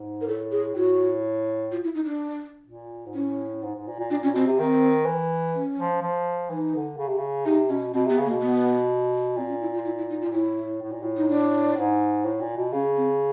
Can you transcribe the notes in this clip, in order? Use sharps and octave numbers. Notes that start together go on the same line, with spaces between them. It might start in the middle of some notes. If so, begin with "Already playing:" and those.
Already playing: G#2
A#4
A2 A4
G#4
A2 F#4
F4
E4
D#4
D4
A#2
G#2
A2 C#4
G#2
G#2
A#2
A#2
A#2 D4
A#2 C#4
B2 C4
C3
D#3 C4
E3
C#4
F3
F3
E3 D#4
D3
C#3
C3
C#3
C3 D#4
B2 C#4
B2 C4
C3 B3
C#3
A#3
B2
B3
A#2 C4
C#4
E4
F4
E4
E4
D#4
F4
A#2
A2 E4
A2
A#2
A2
D#4
D4
G#2
A2
A#2
B2
C#3 C#4
C4